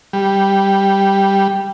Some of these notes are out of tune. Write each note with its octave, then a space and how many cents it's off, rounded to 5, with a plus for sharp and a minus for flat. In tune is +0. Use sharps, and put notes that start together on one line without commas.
G3 +0